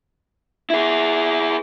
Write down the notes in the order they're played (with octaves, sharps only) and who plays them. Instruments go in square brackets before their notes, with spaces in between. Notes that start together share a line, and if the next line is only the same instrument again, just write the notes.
[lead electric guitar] E4 G#4